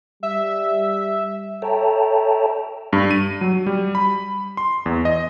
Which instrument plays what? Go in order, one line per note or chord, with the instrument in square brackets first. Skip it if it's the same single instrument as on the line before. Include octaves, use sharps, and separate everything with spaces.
[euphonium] G3 [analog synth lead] E5
[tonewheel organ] A4 C#5 E5 G5 A5 A#5
[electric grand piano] G2
D#7
F#3
G3
B5
C6
E2
D#5